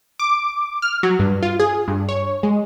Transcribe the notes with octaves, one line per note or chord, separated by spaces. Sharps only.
D6
F6
F#3
G2
F4
G#4
G2
C#5
G#3